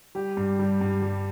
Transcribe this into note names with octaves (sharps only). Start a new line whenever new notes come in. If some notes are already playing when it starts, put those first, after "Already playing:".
G3 G4
G2
G3
G2
G3